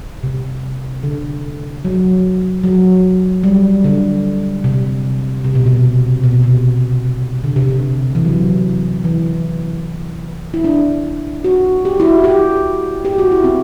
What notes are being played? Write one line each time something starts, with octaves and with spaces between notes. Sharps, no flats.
C3
D3
F#3
F#3
G3
D3
C3
C3
B2
C3
B2
C3
D3
C3
D3
E3
F#3
E3
E4
D4
F#4
G4
E4
F#4
G4
G4
F#4
E4
C4